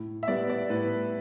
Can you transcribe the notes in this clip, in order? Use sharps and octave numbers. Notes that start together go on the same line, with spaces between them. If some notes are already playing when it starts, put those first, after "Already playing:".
Already playing: A2
E5
G3 B3 D5
D5
A2 B4